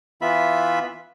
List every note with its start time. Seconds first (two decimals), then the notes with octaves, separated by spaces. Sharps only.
0.22 E3 B3 F4 E5 B5